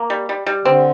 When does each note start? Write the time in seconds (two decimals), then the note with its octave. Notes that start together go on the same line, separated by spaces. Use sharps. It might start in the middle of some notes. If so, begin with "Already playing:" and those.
Already playing: A#3
0.10 G3
0.29 G3
0.46 G3
0.65 D3 C4